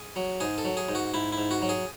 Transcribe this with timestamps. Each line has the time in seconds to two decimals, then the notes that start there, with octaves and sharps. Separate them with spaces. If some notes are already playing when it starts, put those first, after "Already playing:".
Already playing: G#4
0.16 F#3
0.40 G#2 G#4
0.58 A4
0.65 F#3
0.77 G#4
0.89 G#2
0.95 F#4
1.14 G#2 E4
1.32 E4
1.38 G#2
1.51 F#4
1.62 F#3
1.69 G#4